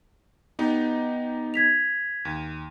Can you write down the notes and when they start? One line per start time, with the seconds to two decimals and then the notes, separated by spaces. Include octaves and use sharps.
0.59 B3 D#4 G4 D#5
1.54 G#6 B6 F7
2.25 D#2